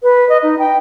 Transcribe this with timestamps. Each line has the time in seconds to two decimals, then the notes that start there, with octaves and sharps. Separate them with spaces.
0.03 B4
0.29 D#5
0.43 D#4
0.59 G5